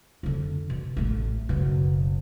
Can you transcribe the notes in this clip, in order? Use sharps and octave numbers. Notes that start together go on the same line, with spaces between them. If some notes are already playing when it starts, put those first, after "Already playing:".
F2 D3
B2
A1 A3
F#1 B2